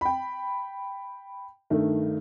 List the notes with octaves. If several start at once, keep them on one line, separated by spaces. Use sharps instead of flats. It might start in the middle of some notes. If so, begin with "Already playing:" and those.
G5 B5
G2 D#3 A3